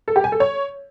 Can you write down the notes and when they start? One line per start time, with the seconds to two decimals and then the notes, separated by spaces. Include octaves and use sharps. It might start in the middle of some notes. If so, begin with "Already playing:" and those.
0.08 A4
0.16 G4
0.24 G#5
0.32 A4
0.40 C#5